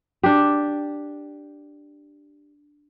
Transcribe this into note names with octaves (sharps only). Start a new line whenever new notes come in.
D4 G4